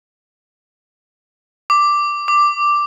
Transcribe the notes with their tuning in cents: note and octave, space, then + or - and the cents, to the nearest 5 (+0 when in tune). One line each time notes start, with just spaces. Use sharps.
D6 +0
D6 +5